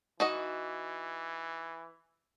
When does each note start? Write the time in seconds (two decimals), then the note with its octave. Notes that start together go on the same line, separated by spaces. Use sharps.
0.20 E3 D#4 F#4 D#5